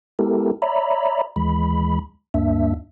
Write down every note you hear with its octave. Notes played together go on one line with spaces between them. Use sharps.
G#3 B3 E4 G4 A4 A#4
C#5 D5 E5 A#5 B5
D#2 E3 G#3 B5
D2 G2 A#3 D4 E5